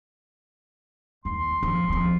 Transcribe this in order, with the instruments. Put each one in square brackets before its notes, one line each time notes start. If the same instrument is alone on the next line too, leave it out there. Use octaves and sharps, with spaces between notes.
[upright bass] D#2 [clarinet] C6
[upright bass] F3
F3 C4